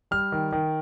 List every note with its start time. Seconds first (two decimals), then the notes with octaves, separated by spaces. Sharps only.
0.11 G3 F6
0.32 D#3
0.52 D#3